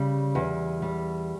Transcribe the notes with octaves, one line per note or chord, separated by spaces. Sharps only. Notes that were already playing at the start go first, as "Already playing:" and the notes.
Already playing: C#3 G3
E2
G3